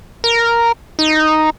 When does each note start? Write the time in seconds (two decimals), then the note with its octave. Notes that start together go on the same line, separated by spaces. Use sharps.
0.24 A#4
0.99 D#4